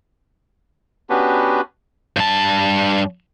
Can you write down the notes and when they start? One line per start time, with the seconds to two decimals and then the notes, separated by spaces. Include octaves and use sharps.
1.10 B3 C#4 D4 F#4 G4 B4
2.17 G2 A5